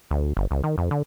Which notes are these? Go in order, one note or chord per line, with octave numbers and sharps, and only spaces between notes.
D2
G1
C#2
D#3
F2
D3